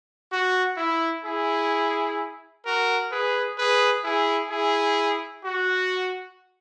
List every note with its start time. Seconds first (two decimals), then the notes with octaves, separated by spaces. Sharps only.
0.31 F#4
0.77 E4
1.24 E4 G#4
2.64 F#4 A#4
3.10 G#4 B4
3.58 G#4 B4
4.04 E4 G#4
4.51 E4 G#4
5.45 F#4